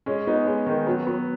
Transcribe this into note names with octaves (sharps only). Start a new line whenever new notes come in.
G#3 C#4
B3 D#4
G#3 C#4
D#3 G#3
F#3 B3
F#3 B3